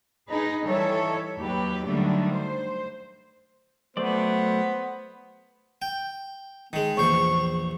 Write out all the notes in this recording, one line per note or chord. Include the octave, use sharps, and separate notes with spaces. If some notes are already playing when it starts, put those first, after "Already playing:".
D#4 G#4 B4
D#3 E3 G3 A4 C#5 E5
D#2 F#3 G4 B4
D3 D#3 F#3 G3 A3 D4
C5
F#3 A3 B3 C5 D5
G5
D#3 G#3
A#1 E2 C5 C#6